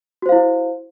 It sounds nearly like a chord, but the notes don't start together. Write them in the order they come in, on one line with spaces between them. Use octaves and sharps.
F#4 C5 F5 E4